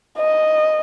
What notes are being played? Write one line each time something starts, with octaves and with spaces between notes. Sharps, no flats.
D#5